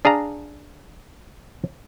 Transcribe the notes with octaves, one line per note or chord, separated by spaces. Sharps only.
D4 G#4 F5 A#5